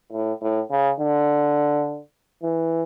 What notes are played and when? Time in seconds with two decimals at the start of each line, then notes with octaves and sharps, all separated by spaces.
0.13 A2
0.42 A2
0.71 C#3
1.00 D3
2.43 E3